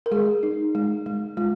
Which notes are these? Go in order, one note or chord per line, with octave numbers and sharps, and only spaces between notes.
A#4
G#3 G#4
D#4
G#3
G#3
G#3 F4